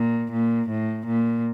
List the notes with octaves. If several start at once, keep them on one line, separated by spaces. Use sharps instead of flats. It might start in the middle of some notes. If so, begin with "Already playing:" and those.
Already playing: A#2
A#2
A2
A#2